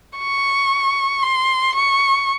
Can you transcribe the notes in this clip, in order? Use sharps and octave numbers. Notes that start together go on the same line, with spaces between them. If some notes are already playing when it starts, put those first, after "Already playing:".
C#6
C6
C#6